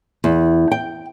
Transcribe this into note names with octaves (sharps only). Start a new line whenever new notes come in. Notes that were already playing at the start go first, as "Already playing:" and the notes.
E2
G5